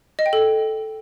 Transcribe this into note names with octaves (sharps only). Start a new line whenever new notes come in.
D#5
G5
A4